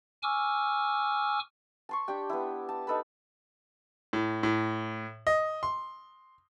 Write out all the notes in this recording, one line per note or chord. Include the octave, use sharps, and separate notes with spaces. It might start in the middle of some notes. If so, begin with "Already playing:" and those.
G#5 C#6 D6 E6 F6
A5 C6 C#6
D4 G4 G5
B3 E4
A5
D#4 A4 B4 B5
A2
A2
D#5
C6